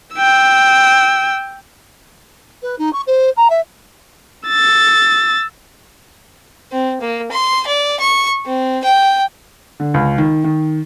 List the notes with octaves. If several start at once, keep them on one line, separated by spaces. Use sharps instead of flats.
G5 E6
B4
D#4
C#6
C5
A#5
E5
E6 A6
C4
A#3
C6
D5
C#6
C4
G5
D3
C#2
D#3
D#3